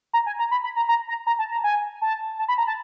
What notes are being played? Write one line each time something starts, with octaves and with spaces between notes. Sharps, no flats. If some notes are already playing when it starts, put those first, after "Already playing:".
A#5
G#5
A#5
B5
B5
A#5
A#5
A#5
A#5
A5
A#5
G#5
A5
A5
B5
A#5
A5